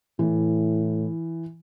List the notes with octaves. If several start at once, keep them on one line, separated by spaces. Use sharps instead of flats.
A2 E3